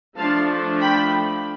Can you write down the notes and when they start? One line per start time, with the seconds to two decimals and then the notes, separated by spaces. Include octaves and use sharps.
0.17 F3 A3 D4 F5 A5
0.81 G5 B5